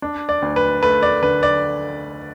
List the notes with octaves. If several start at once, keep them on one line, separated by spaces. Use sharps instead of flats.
D4
D5
D2
B4
A3 B4
D5
D3 B4
D5